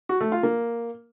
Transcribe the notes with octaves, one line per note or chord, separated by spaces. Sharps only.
F#4
A3
F4
A#3